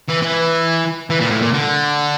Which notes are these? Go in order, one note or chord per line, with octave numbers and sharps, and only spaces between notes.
E3
E3
E3
A#2
A2
A#2
D3